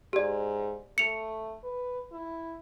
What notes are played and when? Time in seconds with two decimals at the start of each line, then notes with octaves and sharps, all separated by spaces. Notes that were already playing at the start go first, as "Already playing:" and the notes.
0.13 G#2 G4 D5
0.98 A3 C#7 F7
1.64 B4
2.12 E4